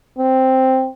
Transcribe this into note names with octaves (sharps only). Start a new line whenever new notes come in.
C4